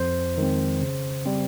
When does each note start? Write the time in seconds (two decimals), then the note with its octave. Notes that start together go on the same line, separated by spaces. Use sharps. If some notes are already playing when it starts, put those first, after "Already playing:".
Already playing: F2 C5
0.38 D#3 G#3 C4
0.81 C#3
1.26 G3 C4